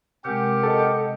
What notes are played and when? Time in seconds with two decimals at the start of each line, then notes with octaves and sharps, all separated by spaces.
0.25 C3 G#3 C4 G4 A#4 F#5
0.63 A4 D#5